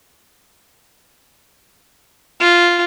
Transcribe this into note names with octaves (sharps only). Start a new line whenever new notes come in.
F4